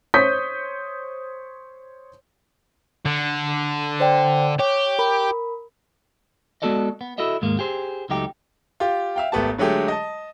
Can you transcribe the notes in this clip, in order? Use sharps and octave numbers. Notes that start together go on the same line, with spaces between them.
C5 C#5 C#6 D#6 G6 B6
D3
C5 D5 G5
G4 C#5
A#4 B5
G#3 B3 F#4 A4 D5 D#5
B3
E4 F#4 A4 D#5 E5
D#2 G#2 G#3 A#3
G4 G#4 C5
C#2 F#3 A3 D#4 G4 G5
F4 G4
E5 F5 G5
G#1 A3 B3 G4 A5
D3 F#3 G#3 A3 G4
D#5 A5